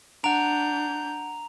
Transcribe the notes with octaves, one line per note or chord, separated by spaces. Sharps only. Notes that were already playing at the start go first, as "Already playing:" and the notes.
D4 F#5 A#5 G6 D7 F7